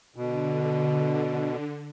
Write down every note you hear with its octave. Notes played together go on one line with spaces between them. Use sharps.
B2 D3